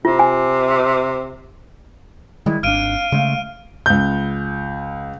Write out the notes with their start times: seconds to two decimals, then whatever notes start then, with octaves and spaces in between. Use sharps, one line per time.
0.05 C3 F4
0.19 G#5
2.46 D#3 G3 G#3 E4
2.63 G#1 D4 F5 F6 D7 D#7
3.12 C#3 G#3 A3
3.86 C#2 G6